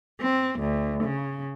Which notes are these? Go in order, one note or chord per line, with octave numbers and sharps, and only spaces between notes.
C4
D2
C#3